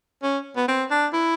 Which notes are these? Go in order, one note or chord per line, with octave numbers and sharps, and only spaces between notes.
C#4
B3
C4
D4
E4